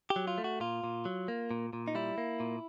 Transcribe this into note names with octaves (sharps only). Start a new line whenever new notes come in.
G4
F#3
F4
A3
F#4
A#2 F4
A#2
F#3
A#3
A#2
A#2
D#4
G3 E4
A#3
A#2